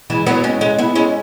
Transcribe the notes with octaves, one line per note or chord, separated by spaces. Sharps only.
E3 G#3
F#3 B3
G#3 C#4
G#3 C#4
B3 E4
G#3 C#4